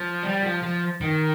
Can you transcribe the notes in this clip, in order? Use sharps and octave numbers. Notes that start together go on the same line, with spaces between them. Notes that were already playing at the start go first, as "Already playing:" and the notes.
Already playing: F3
G3
F3
F3
D#3